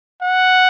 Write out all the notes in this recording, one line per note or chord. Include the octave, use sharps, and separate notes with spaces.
F#5